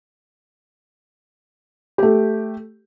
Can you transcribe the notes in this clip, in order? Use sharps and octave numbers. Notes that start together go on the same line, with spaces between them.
A3 G4